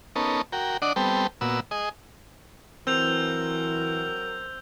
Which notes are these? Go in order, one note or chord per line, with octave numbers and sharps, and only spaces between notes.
B3 C#4 D#4 A4 A#4
F#4 A#4 G5
D4 D5 D#5 F#5
G3 B3 C4 A4 G5
A#2 B3 F#4 E6
G#4 D#5
E3 F#3 C4 A#4 E6 G6 F7